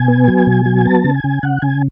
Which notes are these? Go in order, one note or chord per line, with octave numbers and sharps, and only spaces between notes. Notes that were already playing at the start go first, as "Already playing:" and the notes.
Already playing: B2 G#5
B3
F#3
B2
F#3
B3 A5
C#3
G#5
C#3
C#3 F#5
C#3 G#5